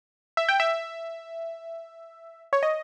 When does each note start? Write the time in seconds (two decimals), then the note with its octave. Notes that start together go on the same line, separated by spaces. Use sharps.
0.37 E5
0.49 G5
0.60 E5
2.53 C#5
2.63 D#5